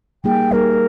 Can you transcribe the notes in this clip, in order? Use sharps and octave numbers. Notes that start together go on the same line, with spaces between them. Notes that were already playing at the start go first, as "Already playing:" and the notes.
G3 A#3 D#4 G#4 G5
G3 A#3 D#4 G#4 A#4